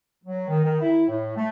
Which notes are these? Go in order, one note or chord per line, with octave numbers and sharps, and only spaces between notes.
F#3
D#3
D#3
E4
A2
A3